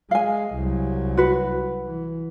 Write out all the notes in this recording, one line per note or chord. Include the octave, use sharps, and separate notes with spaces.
G#3 F5 G#5
C2 F#3
F#4 B4
E3